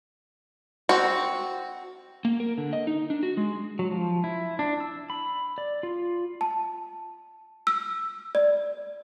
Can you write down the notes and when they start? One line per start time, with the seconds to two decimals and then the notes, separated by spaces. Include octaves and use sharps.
0.89 C4 F#4
2.25 A#3
2.40 A#4
2.58 D3
2.73 D#5
2.87 D#4
3.10 D4
3.23 F#4
3.37 G#3
3.79 F#3
3.91 F3
4.24 E4
4.59 D4
4.80 E6
5.10 B5
5.58 D5
5.83 F4
6.41 A5
7.67 E6
8.35 D5